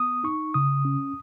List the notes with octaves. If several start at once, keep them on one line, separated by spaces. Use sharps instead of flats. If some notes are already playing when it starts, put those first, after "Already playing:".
Already playing: B3 D#6
D#4 C#6
C#3 D#6
C#4